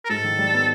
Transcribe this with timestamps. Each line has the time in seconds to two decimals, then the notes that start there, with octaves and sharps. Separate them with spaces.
0.05 A#4
0.09 G#2 A4
0.24 D#3
0.38 G3
0.54 B3